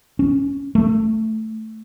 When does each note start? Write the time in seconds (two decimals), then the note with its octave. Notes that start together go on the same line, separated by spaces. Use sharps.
0.19 C#4
0.75 A3